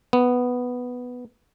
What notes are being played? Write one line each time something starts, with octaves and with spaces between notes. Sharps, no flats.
B3